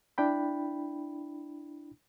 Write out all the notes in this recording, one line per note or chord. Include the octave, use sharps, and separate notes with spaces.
D4 E4 G5 B5